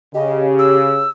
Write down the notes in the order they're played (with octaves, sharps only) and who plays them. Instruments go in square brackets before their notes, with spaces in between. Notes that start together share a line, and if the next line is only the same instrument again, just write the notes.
[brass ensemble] C#3 [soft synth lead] G4 [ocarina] D#5
[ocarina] E6